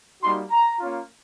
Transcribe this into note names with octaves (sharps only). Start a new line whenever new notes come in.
G3 A#3 D#4 F#4 C6
A#5
A#3 C#4 F4